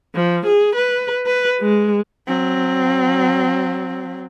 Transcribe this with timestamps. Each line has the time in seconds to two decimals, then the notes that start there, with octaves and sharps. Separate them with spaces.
0.15 F3
0.46 G#4
0.75 B4
1.26 B4
1.61 G#3
2.27 F#3 C4